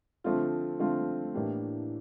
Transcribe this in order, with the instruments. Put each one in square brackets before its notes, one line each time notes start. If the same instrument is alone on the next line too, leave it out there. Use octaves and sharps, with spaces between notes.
[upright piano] D3 F3 A3 C4 F4
D3 F3 A3 C4 F4
A2 E3 A#3 D4 G4